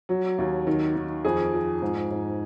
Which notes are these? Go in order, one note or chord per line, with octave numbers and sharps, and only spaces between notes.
F#3
D#2
D#3
D#3
F2 G#4
F3
G#2
G#2